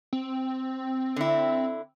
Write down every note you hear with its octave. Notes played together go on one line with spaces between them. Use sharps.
C4
D3 E4